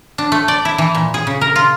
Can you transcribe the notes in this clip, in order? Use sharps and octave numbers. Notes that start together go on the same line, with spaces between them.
D4
A3
D5
E4
E3
A#2
G#4
C#3
A#4
F4